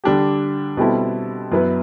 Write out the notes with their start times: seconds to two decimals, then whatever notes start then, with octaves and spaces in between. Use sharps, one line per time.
0.04 D3 G3 D4 G4
0.77 B2 G3 C4 E4 A4
1.52 F#2 F#3 B3 E4 B4